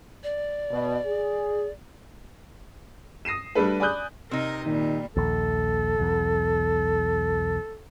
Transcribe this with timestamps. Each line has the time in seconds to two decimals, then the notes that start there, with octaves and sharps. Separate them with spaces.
0.23 D5
0.71 B2
1.06 G#4
3.25 D#6 A#6 C7 D#7 E7
3.55 G3 A3 D4 A4 B4
3.80 D5 G#5 B5 D#6 F#6 G6
4.31 C3 D#4 A#4 D#5
4.66 A#2 D#3 G3
5.17 A#1 D#2 A4
5.98 B1 E2